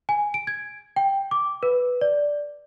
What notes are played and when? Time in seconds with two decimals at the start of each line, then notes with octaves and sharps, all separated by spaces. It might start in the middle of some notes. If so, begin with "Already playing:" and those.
0.09 G#5
0.34 D7
0.47 G#6
0.96 G5
1.31 D6
1.63 B4
2.01 D5